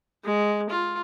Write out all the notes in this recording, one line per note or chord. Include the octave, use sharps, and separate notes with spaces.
G#3
F4